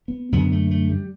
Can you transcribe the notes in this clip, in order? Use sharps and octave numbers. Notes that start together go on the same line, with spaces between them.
B3
F#2 D3 B3
A3
A3
G3